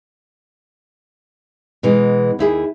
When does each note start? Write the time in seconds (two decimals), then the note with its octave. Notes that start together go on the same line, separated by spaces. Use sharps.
1.83 B2 E3 G#3
2.39 D#2 E4 G#4